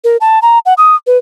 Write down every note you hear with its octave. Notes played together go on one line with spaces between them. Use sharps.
A#4
A5
A#5
F#5
D#6
B4